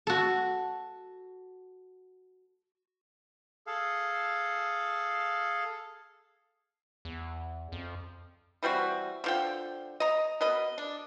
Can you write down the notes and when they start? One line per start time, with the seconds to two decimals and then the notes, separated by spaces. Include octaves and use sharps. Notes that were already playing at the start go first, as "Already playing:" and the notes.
0.07 F#4 A4
3.67 G#4 A4 F5
7.05 E2
7.72 F2
8.63 E3 G3 C4 F#4
9.24 D3 F3 G5
10.00 D#5 A#5
10.41 B2 A#4 B4 D#5
10.78 D4